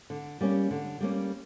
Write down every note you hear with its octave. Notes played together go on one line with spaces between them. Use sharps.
D3
G3 A#3 C#4
D3
G3 A#3 C#4